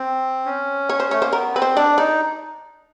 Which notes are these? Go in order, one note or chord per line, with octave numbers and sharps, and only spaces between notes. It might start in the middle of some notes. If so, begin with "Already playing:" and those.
Already playing: C4
C#4
C#5
C5
A3 C#5
A#3 C5
B3 A#4
C4 B4
C5
D4 D5
D#4 D5